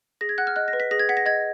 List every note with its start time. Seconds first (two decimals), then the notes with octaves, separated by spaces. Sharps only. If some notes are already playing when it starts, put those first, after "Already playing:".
0.21 G#4 A#6
0.29 G#6
0.38 F#5 F#6
0.47 F6
0.56 D#5 F#6
0.68 A#6
0.73 B4
0.80 B6
0.91 G#4 A#6
0.99 G#6
1.09 F#5 B6
1.17 A#6
1.26 D#5 G#6